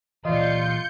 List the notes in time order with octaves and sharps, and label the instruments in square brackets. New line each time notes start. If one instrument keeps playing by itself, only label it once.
[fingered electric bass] A#2 E3 [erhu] F4 [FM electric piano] D5 D#5 [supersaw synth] G6 C#7